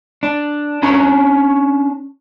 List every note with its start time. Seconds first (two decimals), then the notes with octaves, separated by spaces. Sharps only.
0.23 D4
0.83 C#4 D4 A#5